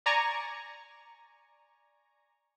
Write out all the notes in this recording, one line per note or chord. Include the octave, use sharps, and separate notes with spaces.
D5 G#5 A#5 C#6